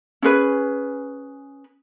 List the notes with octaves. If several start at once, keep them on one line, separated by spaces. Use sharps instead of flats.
C#4 G#4 B4